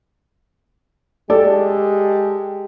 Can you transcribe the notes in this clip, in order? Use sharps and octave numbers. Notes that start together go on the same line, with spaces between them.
G#3 G4 A4 D5